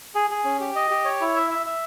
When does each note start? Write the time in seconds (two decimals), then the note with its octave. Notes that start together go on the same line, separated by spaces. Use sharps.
0.15 G#4
0.30 G#4
0.44 C#4
0.60 G4
0.76 D#5
0.90 G4
1.05 C#5
1.21 E4
1.36 E5
1.51 E5
1.66 E5